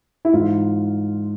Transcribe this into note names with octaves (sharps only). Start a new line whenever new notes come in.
E4
G#2 E3 F4